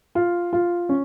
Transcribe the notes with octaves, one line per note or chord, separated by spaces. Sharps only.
F4
F4
C#4